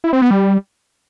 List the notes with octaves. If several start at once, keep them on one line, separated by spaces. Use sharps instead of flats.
E4
C4
B3
G3